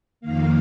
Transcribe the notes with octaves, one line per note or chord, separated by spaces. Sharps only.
F2 D#3 A#3 F5